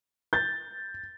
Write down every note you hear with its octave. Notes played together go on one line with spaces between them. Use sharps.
G6 A6